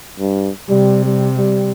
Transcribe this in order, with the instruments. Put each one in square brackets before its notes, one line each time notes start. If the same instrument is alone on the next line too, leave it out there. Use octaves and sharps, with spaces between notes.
[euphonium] G2
[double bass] C3 [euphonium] G3
[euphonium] G3
G3